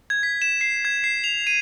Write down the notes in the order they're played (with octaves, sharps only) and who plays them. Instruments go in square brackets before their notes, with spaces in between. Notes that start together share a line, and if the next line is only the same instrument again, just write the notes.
[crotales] G#6
B6
E7
C7
G#6
C7
F7
D#7